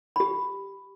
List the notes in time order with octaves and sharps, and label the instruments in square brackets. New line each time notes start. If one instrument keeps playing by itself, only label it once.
[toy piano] G4 B5